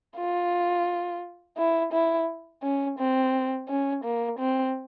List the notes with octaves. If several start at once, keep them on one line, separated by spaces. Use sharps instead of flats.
F4
E4
E4
C#4
C4
C#4
A#3
C4